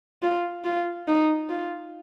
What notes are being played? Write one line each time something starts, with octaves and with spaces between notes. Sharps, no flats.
F4
F4
D#4
F4